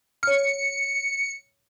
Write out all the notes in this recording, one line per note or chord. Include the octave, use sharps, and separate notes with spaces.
C#5 F6 C#7